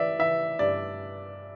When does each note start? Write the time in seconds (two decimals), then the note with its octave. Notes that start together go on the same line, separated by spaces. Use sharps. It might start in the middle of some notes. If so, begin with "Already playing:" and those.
Already playing: E3 D5 E5
0.19 E3 E5
0.59 G2 D5